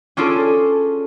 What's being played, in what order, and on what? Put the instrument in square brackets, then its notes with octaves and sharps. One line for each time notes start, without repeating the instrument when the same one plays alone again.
[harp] C#4 D4 F4 G#4 A4